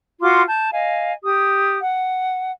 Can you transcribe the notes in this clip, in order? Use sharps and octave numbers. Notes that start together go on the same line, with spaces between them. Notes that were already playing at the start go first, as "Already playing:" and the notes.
F4 F#4 C6 D6
A5 G6
D#5 F5 G#5
G4 D#6
F#5